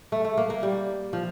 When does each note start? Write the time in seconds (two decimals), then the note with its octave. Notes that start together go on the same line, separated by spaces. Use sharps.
0.12 A3
0.25 A3
0.37 A#3
0.50 A#3
0.63 G3
1.13 F3